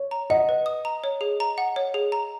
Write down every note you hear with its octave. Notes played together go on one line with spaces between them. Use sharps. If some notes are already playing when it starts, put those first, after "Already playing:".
Already playing: C#5
A#5
D#5 F#5
B4
D#6
A#5
C#5
G#4
A#5
F#5
C#5
G#4
A#5